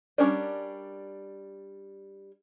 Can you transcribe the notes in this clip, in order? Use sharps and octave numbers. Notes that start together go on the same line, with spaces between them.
G3 C#4 D4 A#4 D5